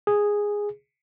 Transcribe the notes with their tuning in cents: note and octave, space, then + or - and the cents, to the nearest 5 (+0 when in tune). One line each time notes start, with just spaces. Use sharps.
G#4 -5